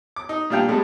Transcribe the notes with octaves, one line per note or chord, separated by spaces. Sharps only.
D6
D#4
A#2 G3 D4 F5 G5
A2 G3 G#3